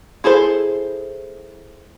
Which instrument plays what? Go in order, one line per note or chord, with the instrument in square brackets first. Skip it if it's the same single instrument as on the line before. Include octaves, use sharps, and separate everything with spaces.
[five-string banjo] E4 G#4 A4 C5